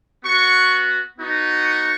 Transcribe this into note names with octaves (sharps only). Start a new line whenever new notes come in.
B3 F#4 C#6
B3 D#4 F#4
C#6